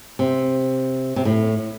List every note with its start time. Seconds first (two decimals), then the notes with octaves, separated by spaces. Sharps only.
0.19 C3
1.16 C3
1.25 A2